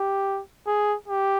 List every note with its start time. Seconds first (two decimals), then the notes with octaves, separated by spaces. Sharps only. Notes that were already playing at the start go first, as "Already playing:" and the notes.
Already playing: G4
0.67 G#4
1.08 G4